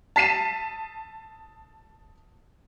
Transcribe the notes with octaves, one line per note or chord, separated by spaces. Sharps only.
A5 B6 C7 D#7 E7